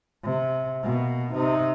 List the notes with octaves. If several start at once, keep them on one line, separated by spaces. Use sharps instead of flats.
C3
B2 A#3
C3 D#4